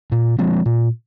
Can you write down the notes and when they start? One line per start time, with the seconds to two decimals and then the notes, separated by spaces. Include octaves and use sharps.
0.12 A#2
0.39 F3 G#3 C4
0.66 A#2